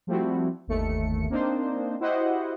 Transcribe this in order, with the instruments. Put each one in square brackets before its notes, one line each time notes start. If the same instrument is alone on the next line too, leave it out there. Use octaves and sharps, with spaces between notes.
[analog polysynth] F3 G3 A3 C4 E4 F#4
G1 D#2 A3 C#7
A#3 C4 D4 D#4 C5
E4 F#4 G4 C5 D#5 F#5